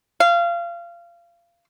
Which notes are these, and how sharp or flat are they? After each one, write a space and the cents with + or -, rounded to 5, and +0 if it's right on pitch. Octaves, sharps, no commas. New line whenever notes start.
F5 -25